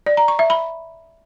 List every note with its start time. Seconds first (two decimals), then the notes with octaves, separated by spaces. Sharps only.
0.06 D5
0.17 A#5
0.28 C#6
0.39 E5
0.50 B5